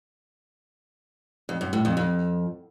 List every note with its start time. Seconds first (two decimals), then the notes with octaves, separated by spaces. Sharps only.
1.49 F2
1.61 F#2
1.73 A2
1.85 F2
1.97 F2